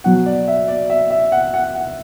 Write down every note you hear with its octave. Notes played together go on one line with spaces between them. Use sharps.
B2 F#3 F#5
D5
E5
D5
E5
E5
F#5
F#5
F#5